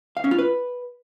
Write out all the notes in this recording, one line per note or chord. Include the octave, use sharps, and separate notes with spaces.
F5
C#4
F4
B4